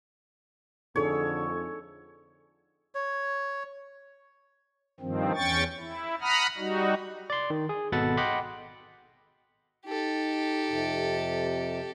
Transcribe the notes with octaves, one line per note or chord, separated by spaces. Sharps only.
F2 D3 D#4 G#4 A4 C#5
C#5
G2 D#3 F3 C4
E2 C#4 G5 C#6 A6
E4
F#5 A#5 B5 D#6 F6
G3 D#4 F#4
D5 C6
D#3
G#4
G#1 B2 A4 F#5 B5 A6
D#5 F#5 G5 B5 C6 D6
D#4 G4 A4
F2 C3